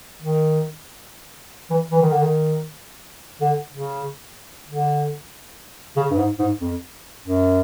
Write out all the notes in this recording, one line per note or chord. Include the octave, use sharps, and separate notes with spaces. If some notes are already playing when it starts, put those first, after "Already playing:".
D#3
E3
E3
D#3
D3
D#3
D3
C#3
D3
C#3
G2
G#2
G#2
F2
F#2